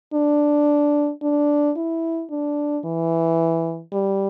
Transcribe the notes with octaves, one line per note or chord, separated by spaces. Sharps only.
D4
D4
E4
D4
E3
G3